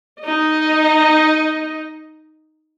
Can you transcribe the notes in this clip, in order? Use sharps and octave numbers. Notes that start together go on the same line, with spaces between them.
D#4 D#5